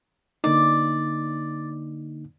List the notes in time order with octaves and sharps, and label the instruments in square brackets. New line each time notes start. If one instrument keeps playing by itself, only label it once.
[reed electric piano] D3 A#3 D#4 [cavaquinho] D5